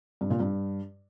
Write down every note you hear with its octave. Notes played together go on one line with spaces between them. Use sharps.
G2
A#2
G2